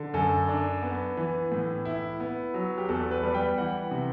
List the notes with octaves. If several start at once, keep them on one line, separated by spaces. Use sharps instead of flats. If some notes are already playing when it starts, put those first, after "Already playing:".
Already playing: D3
F#2 A4
D4
B3
E3
A2
E4
B3
F#3
G4
E2 A4
B4
G3
G5
E3 F#5
C3